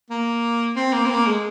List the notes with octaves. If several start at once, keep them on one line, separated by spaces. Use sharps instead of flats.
A#3
C4
A#3
C4
A#3
G#3